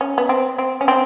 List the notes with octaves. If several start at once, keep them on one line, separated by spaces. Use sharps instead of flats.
C#4
B3
C4
C4
C#4
C4